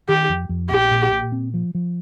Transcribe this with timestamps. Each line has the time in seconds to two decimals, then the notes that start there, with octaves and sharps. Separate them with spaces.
0.09 D#3 G4
0.29 F2
0.49 F2
0.70 A#1 G4
0.91 A#2
1.12 A#2
1.32 C4
1.54 F3
1.75 F3